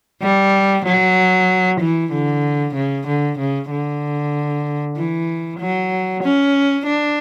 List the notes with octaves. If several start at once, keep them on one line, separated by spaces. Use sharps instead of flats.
G3
F#3
E3
D3
C#3
D3
C#3
D3
E3
F#3
C#4
D4